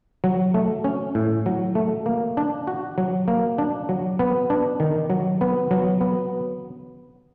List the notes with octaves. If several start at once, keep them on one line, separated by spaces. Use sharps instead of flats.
F#3
A3
C#4
A2
F#3
A3
A#3
D4
F#4
F#3
A#3
D4
F#3
B3
D4
D#3
F#3
B3
F#3
B3